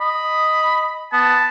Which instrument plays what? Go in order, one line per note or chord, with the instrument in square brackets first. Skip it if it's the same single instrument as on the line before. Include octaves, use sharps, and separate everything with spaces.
[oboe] D#5 [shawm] B5
[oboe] B3 [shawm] A5